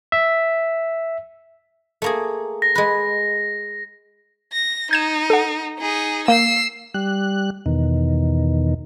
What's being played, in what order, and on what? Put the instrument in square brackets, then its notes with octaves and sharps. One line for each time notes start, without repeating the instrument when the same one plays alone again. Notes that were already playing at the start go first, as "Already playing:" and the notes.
[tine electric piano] E5
[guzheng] A3 A#3 G#4
[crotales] A#6
[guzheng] G#3 B4
[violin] A#6
[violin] D#4 [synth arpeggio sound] G6 G#6 E7
[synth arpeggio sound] A4 F#5
[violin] D#4 G#4
[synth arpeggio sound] A#3 [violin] E6 C7
[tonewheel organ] G3 F#6
E2 B2 D#3